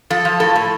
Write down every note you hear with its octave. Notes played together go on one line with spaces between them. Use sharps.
F3 A4
F3
A2 A4
A2